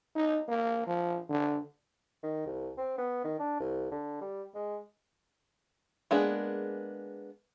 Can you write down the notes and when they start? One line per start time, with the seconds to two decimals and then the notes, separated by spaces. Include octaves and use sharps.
0.15 D#4
0.48 A#3
0.87 F3
1.29 D3
2.23 D#3
2.46 C2
2.78 C4
2.98 B3
3.24 D#3
3.39 D4
3.60 C2
3.91 D3
4.21 G3
4.55 G#3
6.11 G#3 A#3 B3 D4 G#4